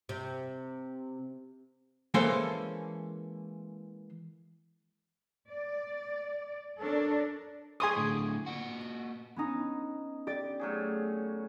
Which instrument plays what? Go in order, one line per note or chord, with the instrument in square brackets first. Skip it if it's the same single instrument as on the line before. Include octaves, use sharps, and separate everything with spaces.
[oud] C3
[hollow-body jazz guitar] E3 G#3 A#3 C#4 A4 C5
[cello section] D5
D4 A4 A#4 C#5 D5
[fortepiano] G#4 C6 C#6 [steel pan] G#5 D#6
[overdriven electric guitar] A2 D3
A#2 F#4
[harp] B3 C#4 D#4
G4 D5 A6
[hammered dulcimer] A2 F#3 G#4